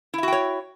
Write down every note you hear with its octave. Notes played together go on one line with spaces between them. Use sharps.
E4 F#4 C#5 E5 G5